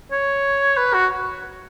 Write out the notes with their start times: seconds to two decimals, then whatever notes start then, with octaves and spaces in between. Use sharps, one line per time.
0.12 C#5
0.77 B4
0.94 F#4